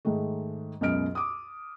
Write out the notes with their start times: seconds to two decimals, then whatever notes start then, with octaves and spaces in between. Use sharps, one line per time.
0.05 G#2 D#3 G#3 A3
0.81 C#2 F#2 B2 D#5 F6 D7
1.15 D6 D#6